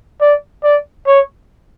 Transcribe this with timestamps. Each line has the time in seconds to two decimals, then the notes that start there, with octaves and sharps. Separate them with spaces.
0.21 D5
0.64 D5
1.07 C#5